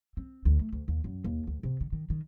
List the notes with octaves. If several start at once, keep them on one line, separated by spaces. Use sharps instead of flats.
C4
D2
A3
D2
D#2
F#2
D#2
D2
C3
D3
D#3
D#3